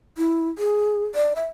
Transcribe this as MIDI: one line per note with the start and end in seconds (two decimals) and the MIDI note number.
0.18 0.48 64
0.58 1.04 68
1.15 1.34 74
1.36 1.46 76